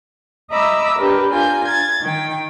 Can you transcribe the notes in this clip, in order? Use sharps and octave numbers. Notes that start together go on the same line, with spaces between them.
D#5 E5 A#5 B5 D6 E6
D4 G4 A#4 B4
D4 F4 A#4 G#5 G6
G#6 A6
D#3 G5